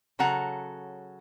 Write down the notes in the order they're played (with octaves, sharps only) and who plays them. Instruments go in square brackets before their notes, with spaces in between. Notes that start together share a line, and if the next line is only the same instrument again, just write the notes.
[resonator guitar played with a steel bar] C#3 F#3 A4 F#5 A#5